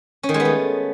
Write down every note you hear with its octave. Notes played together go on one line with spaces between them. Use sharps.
C#4
D#3
G#3
B3
A3